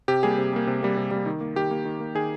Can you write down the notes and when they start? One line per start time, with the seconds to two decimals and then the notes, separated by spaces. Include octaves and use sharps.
0.08 C3 G4
0.23 G3 A#3 G#4
0.38 C3
0.53 G3 A#3
0.67 C3
0.82 G3 A#3
0.97 C3
1.11 G3 A#3
1.26 D#3
1.41 A#3
1.56 D#3 G4
1.71 A#3
1.85 D#3
2.00 A#3
2.15 D#3 G#4